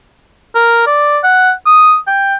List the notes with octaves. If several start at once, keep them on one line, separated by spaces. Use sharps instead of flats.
A#4
D5
F#5
D#6
G5